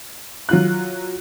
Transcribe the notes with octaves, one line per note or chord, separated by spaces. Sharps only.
F#3 F4 F#6